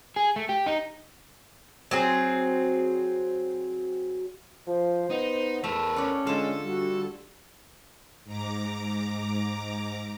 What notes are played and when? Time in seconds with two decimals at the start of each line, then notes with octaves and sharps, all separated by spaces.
0.16 G#4
0.36 A3
0.49 G4
0.66 D#4
1.91 F#3 C4 G#4
4.67 F3 C5
5.10 B3 D#4
5.64 E2 A3 A#4 B4 E5
5.96 C#4 D5 F#5
6.27 D3 G#3 F4 A4
6.64 G3 F#4
8.25 G#2 A#5 D6